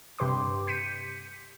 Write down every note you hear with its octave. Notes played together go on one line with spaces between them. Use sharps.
G2 C3 G4 B4 C6 D6
G6 B6 C#7 D#7